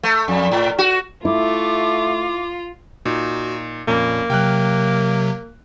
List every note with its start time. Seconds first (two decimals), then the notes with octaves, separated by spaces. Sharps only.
0.03 A3
0.28 F2
0.52 A2
0.78 F#4
1.25 A3 E4 F4 D6
3.05 A#2 D#4 F#4
3.88 F2 A#2 A#3 C#4
4.30 C3 F#3 G5 F6 F#6